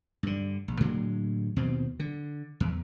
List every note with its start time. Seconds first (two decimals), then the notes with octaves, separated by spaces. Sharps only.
0.23 G2 D3
0.68 A#1
0.80 A2 D3 F#3 G#3
1.56 D#2 B2 C4
2.00 D3
2.60 E2